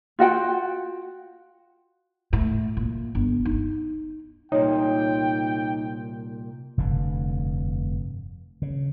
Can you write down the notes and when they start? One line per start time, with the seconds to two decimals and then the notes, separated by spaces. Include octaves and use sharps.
0.19 F4 F#4 F#5 G5
2.33 A2
2.77 A#2
3.15 G1
3.45 D#4
4.52 C2 A#2 D#4 C#5 G5
6.77 F1 G2 D3
8.62 C#3